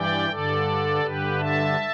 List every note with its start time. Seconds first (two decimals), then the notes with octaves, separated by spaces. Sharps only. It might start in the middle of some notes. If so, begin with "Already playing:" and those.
Already playing: G2 E3 D5 G5
0.30 G2 D3 A4 D5
1.03 G2 D3 G4 B4
1.39 E5 A5